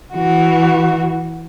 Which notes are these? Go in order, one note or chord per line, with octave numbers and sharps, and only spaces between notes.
E3 F#4